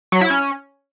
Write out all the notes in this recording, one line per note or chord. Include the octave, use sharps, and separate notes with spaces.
F#3
E4
C#4